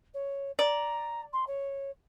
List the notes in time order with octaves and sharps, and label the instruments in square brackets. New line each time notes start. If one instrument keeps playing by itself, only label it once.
[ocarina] C#5
[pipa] D5 [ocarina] A#5
[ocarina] C6
C#5